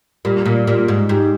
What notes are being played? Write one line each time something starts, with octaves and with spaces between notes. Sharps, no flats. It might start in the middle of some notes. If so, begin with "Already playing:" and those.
A#2 G3
A#2
A#2 G3
G#2
G#2 G4